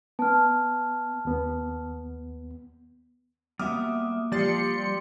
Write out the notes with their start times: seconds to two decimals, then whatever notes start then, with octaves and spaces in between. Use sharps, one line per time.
0.19 B3 A5 F6
1.25 D#2 B3
3.59 G3 A#3 B3 F#4 E5 D6 D#6 F6
4.32 F3 G3 G4 D5 C6 A6 C#7